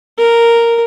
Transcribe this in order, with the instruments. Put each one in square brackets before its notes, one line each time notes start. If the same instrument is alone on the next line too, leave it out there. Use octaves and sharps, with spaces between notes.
[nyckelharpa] A#4